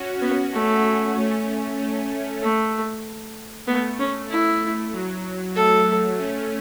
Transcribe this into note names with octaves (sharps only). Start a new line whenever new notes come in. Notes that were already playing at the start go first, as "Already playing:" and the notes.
Already playing: C#4 F#4
B3
A3
A3 C#4
A3
A3
A3 B3
C#4
E4
F#3
A3 A4
A3 C#4